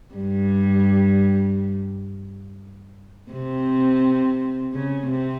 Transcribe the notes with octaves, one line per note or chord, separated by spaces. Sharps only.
G2 G3
C3 C4
C#3 C#4
C3 C4